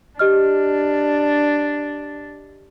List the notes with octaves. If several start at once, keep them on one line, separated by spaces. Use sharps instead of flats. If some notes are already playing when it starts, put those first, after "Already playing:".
D4 G4 D#5 F6